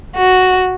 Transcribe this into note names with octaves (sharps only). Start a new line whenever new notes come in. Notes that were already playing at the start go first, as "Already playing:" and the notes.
F#4